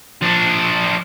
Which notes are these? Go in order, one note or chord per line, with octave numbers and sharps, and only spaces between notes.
F3 D4